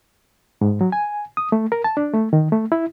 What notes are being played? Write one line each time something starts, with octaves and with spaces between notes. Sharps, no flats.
G#2
F#3
G#5
D#6
A3
A#4
A5
D4
A3
D#3
A3
E4